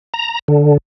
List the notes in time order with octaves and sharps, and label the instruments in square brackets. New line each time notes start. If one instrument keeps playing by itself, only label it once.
[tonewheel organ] A#5
D3